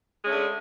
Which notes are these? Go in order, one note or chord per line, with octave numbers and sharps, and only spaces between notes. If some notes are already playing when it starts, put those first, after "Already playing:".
D3 G#3 A3 C#4